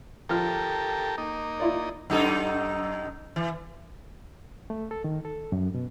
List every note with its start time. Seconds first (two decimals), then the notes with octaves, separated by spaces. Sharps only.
0.29 F3 F4 G4 A4 A#4 F6
1.18 A#3 D#4
1.60 E4 F4 D5
2.10 F#2 D#4 A4
3.36 E3
4.70 A3
4.91 A4
5.04 D#3
5.25 A4
5.52 F#2
5.75 B2